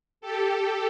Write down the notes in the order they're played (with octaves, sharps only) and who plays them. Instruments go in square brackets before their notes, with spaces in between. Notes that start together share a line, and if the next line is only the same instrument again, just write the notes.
[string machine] G4 A4